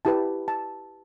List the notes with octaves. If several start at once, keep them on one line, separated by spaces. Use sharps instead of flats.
E4 G4 B4 A5
A5